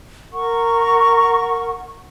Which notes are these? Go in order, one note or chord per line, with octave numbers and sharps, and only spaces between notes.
A#4 F#5 C#6